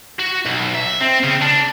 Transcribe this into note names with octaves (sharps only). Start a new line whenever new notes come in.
F#4
B1
E5
C4
C#3
D4